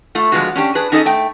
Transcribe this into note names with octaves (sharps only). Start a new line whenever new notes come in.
A3 F4
D3 F3 G#3 B3 F4 F#4
C#4 D4 G4
D4 G#4 B4
C#4 D#4 G#4 A4 C5 D#5
A3 G5